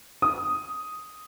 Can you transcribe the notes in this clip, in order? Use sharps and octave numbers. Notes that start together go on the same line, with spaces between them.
D#6